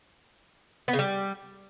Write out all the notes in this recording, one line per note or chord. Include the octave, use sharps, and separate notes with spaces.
B3
C#3
G3